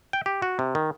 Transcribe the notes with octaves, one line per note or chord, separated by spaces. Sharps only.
G5
G4
F#4
C3
D#3